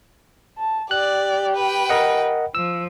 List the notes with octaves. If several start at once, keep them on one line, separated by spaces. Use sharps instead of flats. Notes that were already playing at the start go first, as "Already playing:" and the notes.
A5
G4 D5 F#6
B4 G5
A#4 D#5 F#5
F3 E6